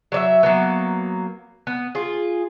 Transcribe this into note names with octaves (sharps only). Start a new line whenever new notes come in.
F#3 D5 E5
F#3 A#3 B3
B3
F4 G#4